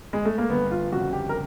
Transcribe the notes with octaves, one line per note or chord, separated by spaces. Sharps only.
G#3
A3
A#3
G1 B3
F4
F2 C#3 F#4
G4
A#4